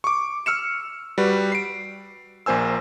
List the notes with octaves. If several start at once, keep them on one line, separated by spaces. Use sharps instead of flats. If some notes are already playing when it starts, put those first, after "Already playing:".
C#6 D6
E6 F6 C#7 E7
G3 F#4 B4
C7 D7
A#1 A#3 C5 G#5 E6